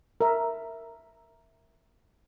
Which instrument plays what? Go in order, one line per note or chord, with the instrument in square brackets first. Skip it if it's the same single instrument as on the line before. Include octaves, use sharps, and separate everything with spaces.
[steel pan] A#4 E5